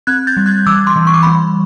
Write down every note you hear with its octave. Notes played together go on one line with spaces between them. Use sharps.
C4 F#6 G#6
G6 A6
G3
F#6 G#6
E3 D6 E6
C6 D6
E3
C#6
D6
G3 B5 C#6